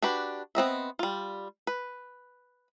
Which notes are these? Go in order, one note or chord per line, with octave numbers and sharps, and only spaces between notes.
D4 F#4 G4 B4
B3 C4 D#5 E5
G3 F4
B4